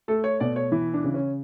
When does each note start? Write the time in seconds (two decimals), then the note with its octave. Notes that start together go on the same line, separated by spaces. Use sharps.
0.08 A3 A4
0.24 C#5
0.40 B2 D5
0.56 C#5
0.72 E3 E4
0.94 D4
1.04 C#3
1.14 C#4